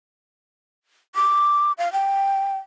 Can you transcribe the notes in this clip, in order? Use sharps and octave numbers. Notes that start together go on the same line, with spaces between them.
D6
F5
G5